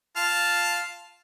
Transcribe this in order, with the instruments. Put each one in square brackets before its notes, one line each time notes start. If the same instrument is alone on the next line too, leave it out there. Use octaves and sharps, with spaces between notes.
[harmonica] F4 F5 A5